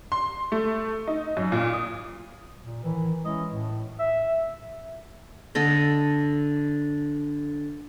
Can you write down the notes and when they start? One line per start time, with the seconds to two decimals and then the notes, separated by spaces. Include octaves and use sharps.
0.12 C6
0.52 A3
1.07 D#4
1.37 F#2
1.52 A#2
1.73 D#6
2.65 A#2
2.83 A2 D#3 E3
3.25 E3 G#3 C#4 E4 D#5
3.52 A2
4.00 E5
5.55 D3 A4 D#5